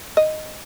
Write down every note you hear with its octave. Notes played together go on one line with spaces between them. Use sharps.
D#5